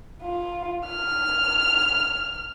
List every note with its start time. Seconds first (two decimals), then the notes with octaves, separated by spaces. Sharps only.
0.22 F4
0.88 F6